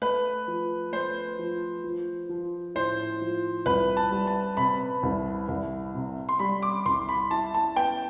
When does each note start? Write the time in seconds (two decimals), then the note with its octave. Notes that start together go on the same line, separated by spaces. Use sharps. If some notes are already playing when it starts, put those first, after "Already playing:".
0.02 A3 B4
0.48 F3
0.93 A3 C5
1.39 F3
1.84 F3
2.29 F3
2.75 A2 C5
3.21 F3
3.66 C2 B4
3.97 A5
4.11 G3
4.27 A5
4.57 C3 B5
5.03 C2
5.48 C2
5.94 C3
6.29 C6
6.39 G3 B5
6.62 D6
6.85 C2 C6
7.09 B5
7.31 E4 A5
7.54 A5
7.76 B3 G5